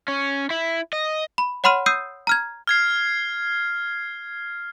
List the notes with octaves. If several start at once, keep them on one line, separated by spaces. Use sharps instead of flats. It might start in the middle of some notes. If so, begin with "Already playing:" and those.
C#4
E4
D#5
B5
C#5 F#5 B5 C6 F6 D#7
D#6 E6 G6 C7 D#7
A#5 F6 G#6
F6 G#6 C7